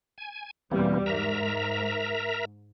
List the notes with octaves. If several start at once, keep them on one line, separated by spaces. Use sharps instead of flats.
G#5
E2 B2 E3 G3 A#3 C4
G#2 A#4 E5 A#5